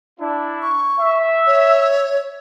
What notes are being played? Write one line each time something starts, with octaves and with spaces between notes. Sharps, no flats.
D4 E4
C#6
E5
C#5